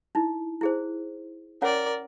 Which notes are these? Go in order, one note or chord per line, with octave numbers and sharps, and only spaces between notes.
D#4 E4
E4 G#4 C5
C#4 A#4 C#5 D5 F#5